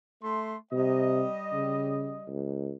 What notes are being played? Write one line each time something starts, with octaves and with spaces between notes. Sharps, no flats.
A3 C6
C3 G3 D#5
C#3
C#2